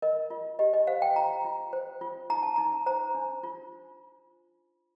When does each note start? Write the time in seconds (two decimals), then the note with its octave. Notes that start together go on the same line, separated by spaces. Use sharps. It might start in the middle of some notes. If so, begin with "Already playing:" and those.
0.02 A#4 D#5
0.30 F4
0.59 G4 D#5
0.74 D#5
0.87 C5 F5
1.02 G5
1.16 F4 A#5
1.45 F4
1.73 C5
2.01 F4
2.30 D#4 A#5
2.43 A5
2.56 D#4 A#5
2.86 C5 A#5
3.15 D4
3.43 F4